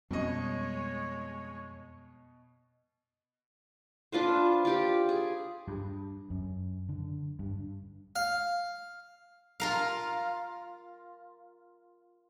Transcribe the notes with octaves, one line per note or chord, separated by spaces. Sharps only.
F2 B2 G3 G#3 C#4 C#5 D#5
D4 F4 B4 C5
F4 G4 D5
G#4
G2
F#2
D3
G2
F5
F4 A#4 F5